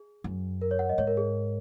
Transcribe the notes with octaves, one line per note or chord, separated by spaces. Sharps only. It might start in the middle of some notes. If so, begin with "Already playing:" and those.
Already playing: G#4
F#2
A#4
C#5
F#5
D#5
G#2 C#5
A#4
G#4